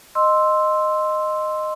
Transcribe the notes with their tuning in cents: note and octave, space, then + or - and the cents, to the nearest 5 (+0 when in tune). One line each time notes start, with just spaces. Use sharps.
D#5 -10 C6 +0 E6 +0